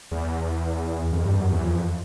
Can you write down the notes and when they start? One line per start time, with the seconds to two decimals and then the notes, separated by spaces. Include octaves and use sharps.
0.12 E2
1.12 F2
1.25 G2
1.39 F#2
1.52 E2
1.64 F2